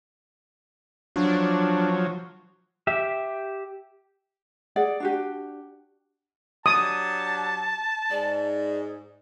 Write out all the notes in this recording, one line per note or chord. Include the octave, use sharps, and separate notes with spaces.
F3 F#3 D4
G4 E5
G#4 D5 F#5
D4 F#4 G4
F#3 D4 G4 A5 D#6
G#2 D5